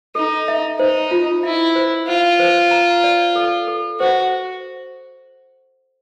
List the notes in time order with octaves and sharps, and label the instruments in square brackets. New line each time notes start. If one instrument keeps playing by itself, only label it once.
[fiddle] D#4 [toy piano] A4
[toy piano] E5
[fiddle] D#4 [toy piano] C5
[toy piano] F4
[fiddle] E4 [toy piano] E5
[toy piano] C5
[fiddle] F4 [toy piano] C5
[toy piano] C5
A#5
D5
A4
A4
[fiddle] F#4 [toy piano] C5